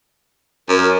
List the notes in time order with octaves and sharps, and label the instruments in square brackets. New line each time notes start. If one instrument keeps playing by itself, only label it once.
[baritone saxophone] F#2 [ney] A#4